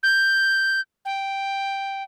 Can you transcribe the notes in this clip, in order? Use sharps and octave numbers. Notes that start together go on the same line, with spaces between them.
G6
G5